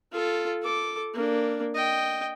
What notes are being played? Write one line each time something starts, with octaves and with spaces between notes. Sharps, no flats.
F4 A4
A4 D6
A#3 D4
D#5 G5